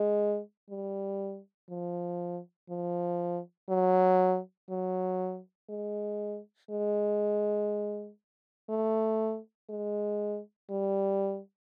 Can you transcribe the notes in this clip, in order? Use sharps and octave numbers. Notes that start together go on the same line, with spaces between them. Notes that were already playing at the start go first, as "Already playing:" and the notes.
Already playing: G#3
G3
F3
F3
F#3
F#3
G#3
G#3
A3
G#3
G3